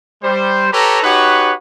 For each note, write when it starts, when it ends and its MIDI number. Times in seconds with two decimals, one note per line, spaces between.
0.22 0.71 55
0.22 0.71 72
0.72 1.02 67
0.72 1.02 69
0.72 1.02 71
0.72 1.02 73
0.72 1.02 82
1.03 1.52 63
1.03 1.52 66
1.03 1.52 67
1.03 1.52 71
1.03 1.52 73
1.03 1.52 78